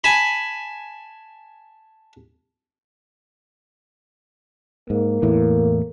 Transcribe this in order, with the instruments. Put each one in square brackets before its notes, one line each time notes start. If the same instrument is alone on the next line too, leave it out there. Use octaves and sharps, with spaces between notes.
[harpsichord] G#5 A5 B5
[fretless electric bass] G#2 [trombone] A#3
[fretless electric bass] E2 A2 E3